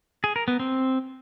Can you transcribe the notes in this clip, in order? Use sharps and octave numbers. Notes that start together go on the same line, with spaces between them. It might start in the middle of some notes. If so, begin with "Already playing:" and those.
G#4
A#4
B3
C4